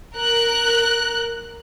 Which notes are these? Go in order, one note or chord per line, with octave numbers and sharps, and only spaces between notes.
A#4 F#6